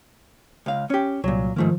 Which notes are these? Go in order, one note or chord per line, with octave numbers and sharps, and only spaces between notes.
C#2 F5
C#4 G4
C2 A#2 F#3
G#2 D#3 F3 A3 A#3